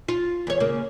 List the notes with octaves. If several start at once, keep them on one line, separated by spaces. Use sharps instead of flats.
F4
E2 C#5
C#3 A#3